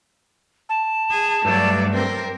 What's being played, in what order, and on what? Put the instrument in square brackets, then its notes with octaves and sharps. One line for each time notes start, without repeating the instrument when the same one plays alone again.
[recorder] A5
[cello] G#4
[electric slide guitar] G2 A3 D4 [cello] F#3 D5
[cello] C4 A#4